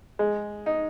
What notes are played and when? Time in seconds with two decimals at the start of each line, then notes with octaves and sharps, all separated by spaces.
0.19 G#3
0.66 D#4